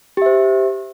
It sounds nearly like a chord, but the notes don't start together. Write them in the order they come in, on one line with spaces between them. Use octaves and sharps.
G4 E5 C5